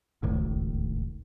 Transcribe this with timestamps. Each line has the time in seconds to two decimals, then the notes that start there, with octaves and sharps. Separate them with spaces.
0.23 D1 G#1 C#2 A2